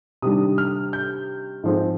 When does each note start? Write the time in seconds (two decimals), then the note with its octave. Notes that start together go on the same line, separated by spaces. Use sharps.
0.22 C3 D#3 G3 D4 D#6
0.58 F6
0.93 G6
1.64 G#2 F3 G#3 C4